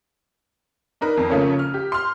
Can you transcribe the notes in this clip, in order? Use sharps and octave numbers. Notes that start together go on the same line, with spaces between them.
D4 D#4 A#4 B4
F2
C#3 F3 A3 A#3 C#4
F6
G4
C6 F6